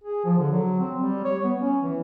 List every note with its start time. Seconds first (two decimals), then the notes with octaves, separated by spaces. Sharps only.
0.04 G#4
0.25 F3
0.39 D3
0.51 F#3
0.80 C4
0.99 G3
1.25 C#5
1.44 B3
1.61 C#4
1.82 E3